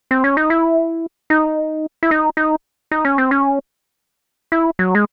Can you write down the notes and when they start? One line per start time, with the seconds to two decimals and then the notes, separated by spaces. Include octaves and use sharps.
0.11 C4
0.24 C#4
0.37 D#4
0.50 E4
1.30 D#4
2.03 E4
2.11 D#4
2.37 D#4
2.91 D#4
3.05 C#4
3.18 C4
3.31 C#4
4.52 E4
4.79 F#3
4.95 G#3